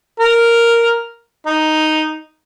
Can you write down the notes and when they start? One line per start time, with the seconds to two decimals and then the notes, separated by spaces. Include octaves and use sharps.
0.20 A#4
1.46 D#4